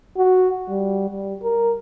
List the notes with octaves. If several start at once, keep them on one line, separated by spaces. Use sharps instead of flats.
F#4
G3
G3
A#4